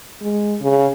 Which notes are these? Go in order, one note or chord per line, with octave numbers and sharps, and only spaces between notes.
G#3
C#3